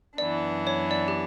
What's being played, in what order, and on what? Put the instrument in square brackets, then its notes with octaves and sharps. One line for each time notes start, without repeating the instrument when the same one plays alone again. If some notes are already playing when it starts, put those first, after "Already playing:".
[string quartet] F#2 E3 B3 D4 [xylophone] D5
[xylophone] C#5
D5
G4